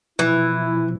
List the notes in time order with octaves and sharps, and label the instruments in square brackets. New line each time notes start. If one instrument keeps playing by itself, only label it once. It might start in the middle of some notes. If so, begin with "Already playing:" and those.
[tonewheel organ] B2 F3 [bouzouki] E3 [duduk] E4